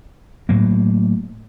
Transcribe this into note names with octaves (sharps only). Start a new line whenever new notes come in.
A2 F#3 A#3